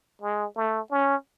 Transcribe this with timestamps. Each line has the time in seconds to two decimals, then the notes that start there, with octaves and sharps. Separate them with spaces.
0.22 G#3
0.56 A3
0.91 C#4